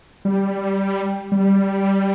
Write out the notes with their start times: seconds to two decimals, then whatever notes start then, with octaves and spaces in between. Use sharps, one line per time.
0.25 G3
1.32 G3